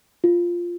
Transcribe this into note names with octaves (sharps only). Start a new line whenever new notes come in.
F4